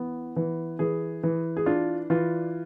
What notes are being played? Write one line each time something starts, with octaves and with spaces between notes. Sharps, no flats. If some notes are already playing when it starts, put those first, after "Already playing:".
Already playing: E3 B3
E3
E3 G#4
E3
G#4
D4 F4
E3 F4